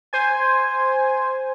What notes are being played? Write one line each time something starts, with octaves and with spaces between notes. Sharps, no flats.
C5 G#5